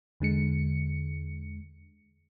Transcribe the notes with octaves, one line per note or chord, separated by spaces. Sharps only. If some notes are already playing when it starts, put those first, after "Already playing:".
E2 D3 G#3 C#7